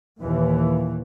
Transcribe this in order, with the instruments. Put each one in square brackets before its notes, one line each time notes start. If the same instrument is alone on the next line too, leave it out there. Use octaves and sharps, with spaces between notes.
[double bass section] D#2 A#2 E3